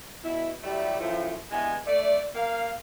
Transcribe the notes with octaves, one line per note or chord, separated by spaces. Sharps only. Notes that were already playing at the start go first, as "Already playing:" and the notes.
B2 E4
F#3 G3 A3 E4 G4 D5
F#2 A2 F3
G2 E3 G#3 B3 G#4 G#5
A3 D5
A#3 F5